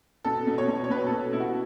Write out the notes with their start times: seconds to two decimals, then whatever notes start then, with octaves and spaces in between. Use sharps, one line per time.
0.25 B2 A4
0.47 B2
0.58 C#5
0.68 B2
0.84 C#5
0.90 B2 B4
1.07 A4
1.12 B2
1.33 B2 E4
1.40 F#4